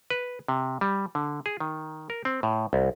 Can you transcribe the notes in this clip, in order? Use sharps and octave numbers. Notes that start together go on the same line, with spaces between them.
B4
C3
G3
D3
G#4
D#3
A#4
C4
A2
C2